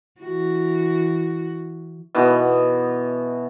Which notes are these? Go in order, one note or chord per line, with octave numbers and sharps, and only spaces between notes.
E3 F#4
B2 E3 B3